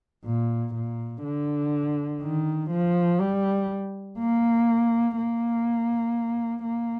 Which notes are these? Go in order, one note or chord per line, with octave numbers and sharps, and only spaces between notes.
A#2
A#2
D3
D#3
F3
G3
A#3
A#3
A#3